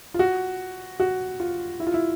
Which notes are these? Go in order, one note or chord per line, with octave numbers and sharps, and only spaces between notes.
F4
F#4
F#4
F4
E4
F4
E4